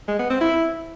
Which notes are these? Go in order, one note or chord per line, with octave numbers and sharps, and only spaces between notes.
G#3
B3
C4
E4